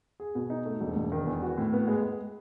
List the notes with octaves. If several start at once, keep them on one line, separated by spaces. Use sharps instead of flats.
G#4
B2
D#4
A3
E1
E1
D#3
E2
F#4
A2
B3
G#3
G#3